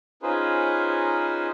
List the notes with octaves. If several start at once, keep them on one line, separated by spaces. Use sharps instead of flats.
C#4 D#4 F4 G#4 B4 C5